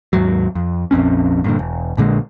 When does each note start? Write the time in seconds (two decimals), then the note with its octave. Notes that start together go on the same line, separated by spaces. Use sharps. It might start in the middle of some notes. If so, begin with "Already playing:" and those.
0.13 D#2 G#2 F#3
0.55 F2
0.91 A#1 F2 C4 C#4
1.44 G2 A#2 D3
1.59 E1
1.97 A#1 A#2 D3 G#3